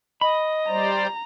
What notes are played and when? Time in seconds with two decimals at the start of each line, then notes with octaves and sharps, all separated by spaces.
0.21 D#5 B5
0.68 G3 C5 D5 A#5